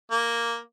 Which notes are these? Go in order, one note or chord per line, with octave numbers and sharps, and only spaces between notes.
A#3